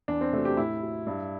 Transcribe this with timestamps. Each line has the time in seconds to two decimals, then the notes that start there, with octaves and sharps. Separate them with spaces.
0.08 E2 D4
0.21 C4
0.33 C3 F#3 A3
0.45 G4
0.57 A2 E4
0.82 F#3
1.07 G2